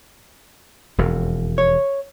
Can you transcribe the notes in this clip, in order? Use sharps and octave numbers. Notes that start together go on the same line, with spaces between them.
E1 F2
C#5